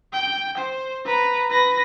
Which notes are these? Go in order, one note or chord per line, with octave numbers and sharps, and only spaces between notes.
G5
C5
B4 A#5
B4 A#6